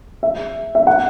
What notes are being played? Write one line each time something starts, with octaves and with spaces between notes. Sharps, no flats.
E5
E5
F#5